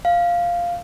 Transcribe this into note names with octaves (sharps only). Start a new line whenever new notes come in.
F5